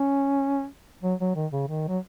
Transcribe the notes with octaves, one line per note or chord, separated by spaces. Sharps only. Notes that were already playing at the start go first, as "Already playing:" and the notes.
Already playing: C#4
F#3
F#3
D#3
C#3
D#3
F#3